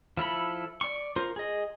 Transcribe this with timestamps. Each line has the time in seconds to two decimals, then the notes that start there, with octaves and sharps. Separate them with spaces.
0.17 F3 E4 A4 B5
0.81 D5 C#6
1.16 F4 A#4 C5
1.36 G#4 D#5